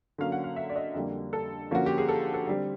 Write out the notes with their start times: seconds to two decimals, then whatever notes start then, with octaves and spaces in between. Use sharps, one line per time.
0.18 D3 F#3 A#3 C#4 F5
0.32 F#5
0.44 F5
0.56 E5
0.70 D5
0.76 D#5
0.94 F2 D3 G3 A#3
1.33 A4
1.71 D3 F3 A#3 C#4 F#4
1.86 G4
1.98 G#4
2.09 A4
2.34 A4
2.47 D3 G3 C4 G4